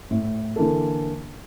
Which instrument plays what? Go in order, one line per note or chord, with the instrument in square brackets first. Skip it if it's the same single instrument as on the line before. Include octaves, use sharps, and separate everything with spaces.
[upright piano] A2
D3 E3 A#3 A4